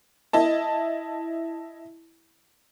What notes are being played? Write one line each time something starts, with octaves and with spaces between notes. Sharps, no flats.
E4 D#5 A5